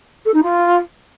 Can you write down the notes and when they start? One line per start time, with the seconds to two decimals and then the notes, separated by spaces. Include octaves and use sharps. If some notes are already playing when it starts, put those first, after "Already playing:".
0.25 A4
0.34 D#4
0.42 F4